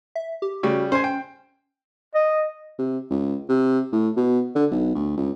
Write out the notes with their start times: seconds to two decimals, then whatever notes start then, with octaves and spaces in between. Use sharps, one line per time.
0.15 E5
0.42 G4
0.63 C#3 G3 F#4
0.92 C#4 C5 G#5
1.04 G5
2.15 D#5
2.79 C3
3.11 C#2
3.49 C3
3.93 A2
4.17 B2
4.55 D3
4.71 B1
4.95 D2
5.17 C#2